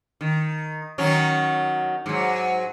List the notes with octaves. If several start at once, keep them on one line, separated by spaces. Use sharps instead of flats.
D#3
D#3 F#3 C#4
G#2 F#3